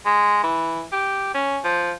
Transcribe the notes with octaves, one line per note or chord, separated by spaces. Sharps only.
G#3
E3
G4
C#4
F3